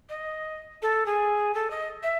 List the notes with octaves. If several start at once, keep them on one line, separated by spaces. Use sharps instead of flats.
D#5
A4
G#4
A4
D#5
E5